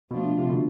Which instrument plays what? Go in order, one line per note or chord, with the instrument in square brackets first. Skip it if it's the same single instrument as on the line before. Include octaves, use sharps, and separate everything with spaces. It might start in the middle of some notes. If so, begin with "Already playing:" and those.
[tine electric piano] B2 [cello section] F3 A3 D4 F4
[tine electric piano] C3
B2 D3